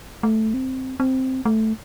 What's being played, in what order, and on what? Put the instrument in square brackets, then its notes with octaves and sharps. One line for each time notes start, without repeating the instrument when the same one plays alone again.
[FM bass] A3
C4
C4
A3